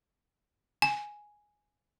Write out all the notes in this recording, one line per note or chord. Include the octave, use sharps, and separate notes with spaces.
G#5